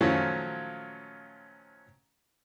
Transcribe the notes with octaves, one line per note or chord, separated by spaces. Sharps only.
A#2 D#3 F3 F#3 A3 C#4